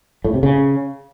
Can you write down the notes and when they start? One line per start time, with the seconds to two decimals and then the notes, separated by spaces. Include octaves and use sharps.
0.24 A2
0.34 C3
0.43 C#3